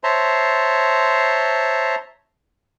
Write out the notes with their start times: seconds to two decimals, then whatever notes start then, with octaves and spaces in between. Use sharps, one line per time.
0.04 C5 C#5 E5 A5 A#5 C6